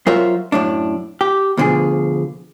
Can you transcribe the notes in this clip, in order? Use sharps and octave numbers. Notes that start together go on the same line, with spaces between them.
F#3 F4 A#4 C5 C#5 E5
F#2 A2 D4
G4
D2 B2 D3 F3 G#4